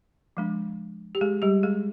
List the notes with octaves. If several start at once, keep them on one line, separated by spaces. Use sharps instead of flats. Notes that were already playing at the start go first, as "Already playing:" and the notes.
F3 G#3 D4
G4
G#3 G#4
G3 G4
G#3 G#4